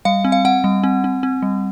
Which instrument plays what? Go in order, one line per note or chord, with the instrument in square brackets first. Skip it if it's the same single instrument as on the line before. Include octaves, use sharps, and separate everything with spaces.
[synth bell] G3 F5
C4
F5
C4 F#5
G3
C4
C4
C4
G3